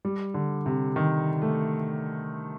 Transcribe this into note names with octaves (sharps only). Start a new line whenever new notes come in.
G3
D3
C3
D#3
A3